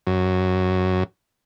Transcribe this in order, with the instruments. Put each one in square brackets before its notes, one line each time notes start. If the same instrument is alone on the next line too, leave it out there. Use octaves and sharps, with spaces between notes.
[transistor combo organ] F#2